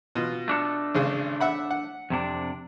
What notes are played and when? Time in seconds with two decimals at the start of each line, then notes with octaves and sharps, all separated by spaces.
0.15 B2 F4
0.48 A3 D4 A4
0.95 G#1 C#3
1.41 E5 F#5 B5
1.71 F#5
2.10 F2 C3 D4